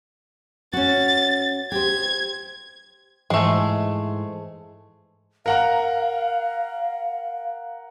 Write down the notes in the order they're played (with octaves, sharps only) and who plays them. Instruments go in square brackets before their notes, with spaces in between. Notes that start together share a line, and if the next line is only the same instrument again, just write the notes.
[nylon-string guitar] C#4 F#4 [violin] A6
[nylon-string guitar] G4 C5 [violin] G#6
[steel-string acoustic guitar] G#2 E3 C5 [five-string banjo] G#3 A3
[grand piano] A#4 F#5 A#5 [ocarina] F5